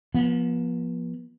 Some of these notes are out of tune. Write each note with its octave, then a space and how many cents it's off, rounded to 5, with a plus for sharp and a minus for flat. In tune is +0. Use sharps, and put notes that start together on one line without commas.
F3 +0 B3 -45